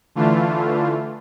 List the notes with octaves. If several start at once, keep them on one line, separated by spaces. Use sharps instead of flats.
D3 E3 A3 F4